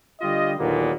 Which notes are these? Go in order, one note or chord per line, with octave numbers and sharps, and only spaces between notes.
D3 G3 F4 G4 D#5
D#2 A#2 D3 F#3 A#3 B3